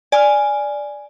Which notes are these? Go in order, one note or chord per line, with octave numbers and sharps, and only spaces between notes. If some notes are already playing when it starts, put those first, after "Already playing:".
D5 G#5 F6